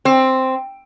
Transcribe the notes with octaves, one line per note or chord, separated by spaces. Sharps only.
C4